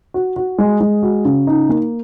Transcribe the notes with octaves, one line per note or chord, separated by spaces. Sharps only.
F#4
F#4
G#3
G#3
F#4
C#3
D#4
A#3